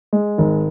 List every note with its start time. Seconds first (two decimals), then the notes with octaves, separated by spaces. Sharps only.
0.13 G#3
0.38 G#1